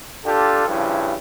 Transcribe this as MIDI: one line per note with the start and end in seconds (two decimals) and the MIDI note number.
0.25 0.64 62
0.25 0.64 65
0.25 0.64 67
0.25 0.64 69
0.67 1.14 43
0.67 1.14 49
0.67 1.14 53
0.67 1.14 64